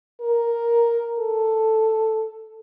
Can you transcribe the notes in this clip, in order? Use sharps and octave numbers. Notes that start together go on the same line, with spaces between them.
A#4
A4